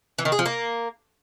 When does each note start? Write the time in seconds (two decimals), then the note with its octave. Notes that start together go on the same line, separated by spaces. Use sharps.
0.18 E3
0.25 D#3
0.32 G#4
0.39 F3
0.46 A#3